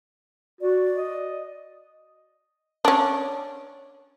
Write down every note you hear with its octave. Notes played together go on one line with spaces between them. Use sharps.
F#4 D5
D#5
C#4 D4